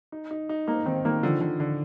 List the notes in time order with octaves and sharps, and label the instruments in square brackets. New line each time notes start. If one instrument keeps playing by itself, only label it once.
[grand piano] D#4
D#4
D#4
[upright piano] A#3 [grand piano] D#4
[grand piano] D#3 [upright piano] C4
[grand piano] D#3 [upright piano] A#3
[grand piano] D3 [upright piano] F3
[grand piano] D3
D3